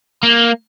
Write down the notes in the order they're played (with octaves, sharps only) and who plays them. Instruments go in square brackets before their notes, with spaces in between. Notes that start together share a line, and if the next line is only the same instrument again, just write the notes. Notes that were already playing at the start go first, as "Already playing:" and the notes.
[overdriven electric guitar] A#3